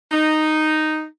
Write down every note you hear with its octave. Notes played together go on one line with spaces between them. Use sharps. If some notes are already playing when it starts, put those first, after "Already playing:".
D#4